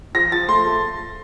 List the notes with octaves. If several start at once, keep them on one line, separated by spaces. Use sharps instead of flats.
F3 A#6
F3 A6
A3 C6
A3